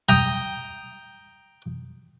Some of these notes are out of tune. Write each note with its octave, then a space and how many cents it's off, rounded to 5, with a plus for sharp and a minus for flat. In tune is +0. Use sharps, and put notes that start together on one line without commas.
G5 +0 A#5 +0 D#6 +0